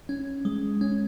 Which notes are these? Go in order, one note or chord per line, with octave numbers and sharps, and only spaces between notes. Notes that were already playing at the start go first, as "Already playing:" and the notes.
C#4
G#3
C#4